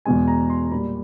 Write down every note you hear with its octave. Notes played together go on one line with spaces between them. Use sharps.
E2 B2 G#3 G#5
A#5
C6
A#2 G3 B5